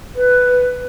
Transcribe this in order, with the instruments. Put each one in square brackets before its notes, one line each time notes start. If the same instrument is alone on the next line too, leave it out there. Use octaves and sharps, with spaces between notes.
[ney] B4